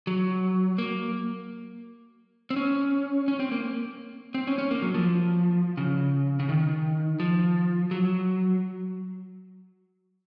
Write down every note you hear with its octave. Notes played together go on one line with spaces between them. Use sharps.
F#3
A#3
C4
C#4
C#4
C4
A#3
C4
C#4
C#4
A#3
F#3
F3
C#3
C#3
D#3
F3
F#3